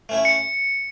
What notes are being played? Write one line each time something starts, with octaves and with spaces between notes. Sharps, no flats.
A3 C#4 E4
C#7